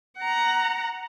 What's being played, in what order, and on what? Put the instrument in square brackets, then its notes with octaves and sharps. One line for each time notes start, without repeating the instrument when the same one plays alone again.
[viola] F#5 A#5